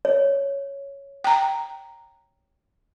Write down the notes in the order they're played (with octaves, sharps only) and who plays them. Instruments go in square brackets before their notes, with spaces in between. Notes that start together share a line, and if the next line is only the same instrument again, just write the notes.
[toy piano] C#5
[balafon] G5 A#5